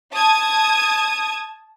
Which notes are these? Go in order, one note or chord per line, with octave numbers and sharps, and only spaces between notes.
A5 D#6 G#6